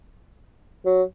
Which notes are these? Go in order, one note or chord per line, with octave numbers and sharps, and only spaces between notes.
F#3